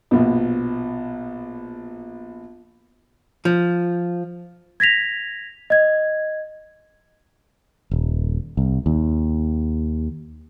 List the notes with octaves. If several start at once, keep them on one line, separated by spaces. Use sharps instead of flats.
A#1 B2
F3
G#6 A#6 B6 F7
D#5 G#6
D#1
C2
D#2